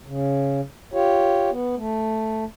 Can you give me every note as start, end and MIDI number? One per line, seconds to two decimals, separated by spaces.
0.06 0.61 49
0.93 1.50 65
0.93 1.50 67
0.93 1.50 73
1.50 1.75 59
1.77 2.44 57